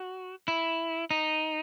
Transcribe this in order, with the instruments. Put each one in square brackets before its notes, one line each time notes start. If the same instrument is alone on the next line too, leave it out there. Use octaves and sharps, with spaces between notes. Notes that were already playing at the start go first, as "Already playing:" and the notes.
Already playing: [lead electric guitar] F#4
E4
D#4